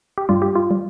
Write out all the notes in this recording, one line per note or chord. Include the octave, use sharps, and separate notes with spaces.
G4
G2 G3 F4
G4
F4
G3